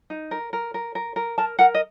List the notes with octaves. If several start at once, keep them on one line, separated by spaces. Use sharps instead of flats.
D#4
A#4
A#4
A#4
A#4
A#4
A#4 A5
A#4 F#5
D#5